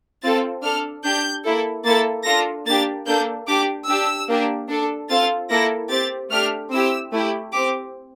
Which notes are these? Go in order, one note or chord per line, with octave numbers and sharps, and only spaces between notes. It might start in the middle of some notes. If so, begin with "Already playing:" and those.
C4 F4 A4 A6
D4 A4 F6
D4 G4 G6
A#3 E4 A4
A#3 E4 A4 A6
D4 F4 A4 A#6
A#3 D4 G4 A6
A#3 D4 A4 G6
D4 G4 D6
D4 G4 E6
A#3 D4 G4
D4 A4
C4 F4 A4 A6
A#3 E4 A4 A#6
C4 G4 A6
A3 D4 G4 F6
C4 E4 G4 E6
A3 E4 G4
C4 G4 D6